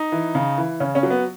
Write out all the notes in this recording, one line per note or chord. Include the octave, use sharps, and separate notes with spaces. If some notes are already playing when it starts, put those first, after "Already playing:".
Already playing: D#4
E3
C#3
E3
C#3 C#4
C#4
F#3
B3